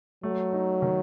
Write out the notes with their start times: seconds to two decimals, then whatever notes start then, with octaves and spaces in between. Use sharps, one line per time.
0.23 F#3 A3
0.53 D#4
0.82 D#3